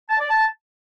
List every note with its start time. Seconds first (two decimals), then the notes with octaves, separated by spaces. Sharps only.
0.10 A5
0.20 D5
0.29 A5